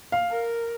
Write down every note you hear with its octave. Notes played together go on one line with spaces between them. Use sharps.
F5
A#4